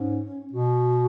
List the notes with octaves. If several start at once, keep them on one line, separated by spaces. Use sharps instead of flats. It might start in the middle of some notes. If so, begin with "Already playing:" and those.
Already playing: G#2 C#4
B2 F#4